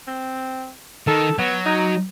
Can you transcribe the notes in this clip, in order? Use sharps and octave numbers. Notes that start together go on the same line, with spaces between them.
C4
D#3 A4
F#3 B3
D#4